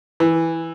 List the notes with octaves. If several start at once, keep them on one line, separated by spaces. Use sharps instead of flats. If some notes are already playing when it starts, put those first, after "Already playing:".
E3